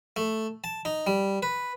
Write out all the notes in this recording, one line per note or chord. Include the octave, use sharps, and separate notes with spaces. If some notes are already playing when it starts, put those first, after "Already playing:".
A3
A5
D#4
G3
B4